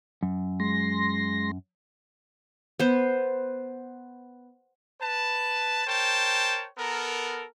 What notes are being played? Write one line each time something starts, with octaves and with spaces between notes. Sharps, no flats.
F#2
G#3 C6 A#6
B3 C5
B4 A5
A#4 C5 C#5 G5 A5
B3 A4 A#4